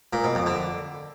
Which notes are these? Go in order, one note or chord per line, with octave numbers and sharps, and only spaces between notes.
A#2
B2
F2
D3